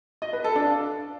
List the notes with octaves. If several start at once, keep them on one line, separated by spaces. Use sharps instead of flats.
D#5
B4
A4
D4
F5